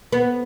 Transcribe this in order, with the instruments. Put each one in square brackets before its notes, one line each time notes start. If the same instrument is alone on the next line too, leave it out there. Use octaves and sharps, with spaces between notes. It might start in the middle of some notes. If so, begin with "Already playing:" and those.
[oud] B3